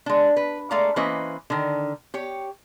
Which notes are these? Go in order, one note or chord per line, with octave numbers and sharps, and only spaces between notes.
G#3 D4
B4
G#3 A3 D5 F5 A#5
E3 A#3 C#4 B4 C5 D#5
D3 D#3
G4 C#5